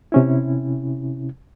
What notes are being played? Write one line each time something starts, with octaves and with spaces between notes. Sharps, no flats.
C3 C#4 E4